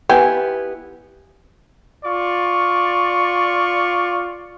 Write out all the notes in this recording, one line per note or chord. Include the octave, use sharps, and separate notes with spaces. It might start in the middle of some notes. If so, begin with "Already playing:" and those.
B3 E4 G4 G#5
F4 D5 C#6